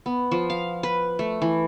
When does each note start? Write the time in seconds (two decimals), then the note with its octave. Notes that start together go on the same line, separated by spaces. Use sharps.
0.06 B3
0.31 F3
0.50 F5
0.83 B4
1.19 A3
1.42 E3